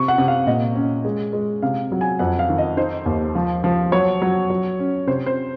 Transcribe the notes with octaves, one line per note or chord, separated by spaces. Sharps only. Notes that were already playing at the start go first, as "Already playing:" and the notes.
Already playing: C3 C#6
F#5
C3
F5
A#2 D#5
C#4
G#3
G#3
C3 F5
F#3
G#5
F2 F#5
F5
D#3
D#5
D#4 C5
D#2
F3
F3
F#3 C#5
F#3
F#3
C#4
C3 C5
C5